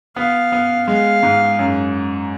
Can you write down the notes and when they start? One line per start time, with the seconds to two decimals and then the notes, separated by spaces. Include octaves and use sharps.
0.16 B3 F5
0.52 B3
0.87 G#3 F5
1.23 G#2
1.59 F#2